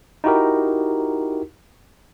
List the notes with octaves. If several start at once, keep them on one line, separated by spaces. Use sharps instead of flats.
D#4 E4 F#4 G4 A#4